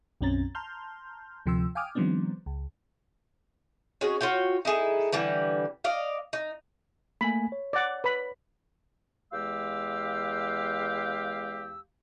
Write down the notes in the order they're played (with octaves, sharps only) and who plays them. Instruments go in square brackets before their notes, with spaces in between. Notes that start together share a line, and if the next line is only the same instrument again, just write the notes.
[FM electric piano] B1 F#2 C4 C#4 A#5 A6
A5 A#5 C6 F6 G6
D2 C3 F3 G5 C6 E6
F5 G5 G#5 D6 D#6 F6
D#3 F3 G3 B3 C4 D4
C#2
[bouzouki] C#4 D#4 F#4 G#4
F4 F#4 C#5 G5
D#4 E4 G#4 A4
D3 E3 G3 B4
D5 D#5 F5
D#4
[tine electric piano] A3 A#3 G#5 [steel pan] B5
[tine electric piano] C#5
[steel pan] D5 F#5
B4 B5
[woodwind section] E2 G#3 G4 F5 E6